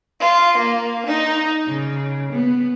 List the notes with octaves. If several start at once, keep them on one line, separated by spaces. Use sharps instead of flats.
F4
A#3
D#4
C#3
B3